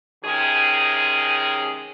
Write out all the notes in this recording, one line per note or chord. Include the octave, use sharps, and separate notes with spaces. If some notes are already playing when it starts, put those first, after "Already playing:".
C3 D#3 G#3 C#4 G#4